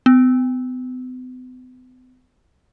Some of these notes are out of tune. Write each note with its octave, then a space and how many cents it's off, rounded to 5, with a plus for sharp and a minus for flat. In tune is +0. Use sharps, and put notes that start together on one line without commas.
B3 +45